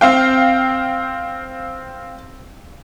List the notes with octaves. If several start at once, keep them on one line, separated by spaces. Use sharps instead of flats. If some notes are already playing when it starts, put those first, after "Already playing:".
C4 F5 G5